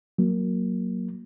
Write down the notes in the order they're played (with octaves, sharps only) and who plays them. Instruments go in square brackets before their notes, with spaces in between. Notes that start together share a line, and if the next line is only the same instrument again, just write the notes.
[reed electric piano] F#3 A#3